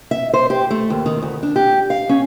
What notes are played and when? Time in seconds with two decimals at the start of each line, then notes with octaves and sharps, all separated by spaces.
0.11 E5
0.33 C5
0.50 G4
0.71 A3
0.90 D#2
1.06 D#3
1.22 D2
1.43 D4
1.56 G4
1.90 F5
2.09 C#4